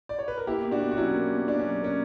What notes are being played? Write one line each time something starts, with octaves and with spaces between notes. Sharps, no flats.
D5
C#5
B4
A#4
A#3 E4 G4
B2
D4 F#4
B2
F#4
F#3 C#4 E4
A#3
B2
B2 D4
F#3 C#4
A#3 C#4